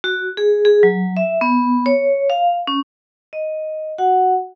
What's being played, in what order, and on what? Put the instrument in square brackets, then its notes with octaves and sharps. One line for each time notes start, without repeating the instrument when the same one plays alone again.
[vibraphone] F#4
G#4
G#4
F#3
E5
B3
C#5
F5
C#4
D#5
F#4 F#5